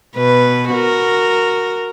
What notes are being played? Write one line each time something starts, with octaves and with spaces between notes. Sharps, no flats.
B2 B4
F#4 A#4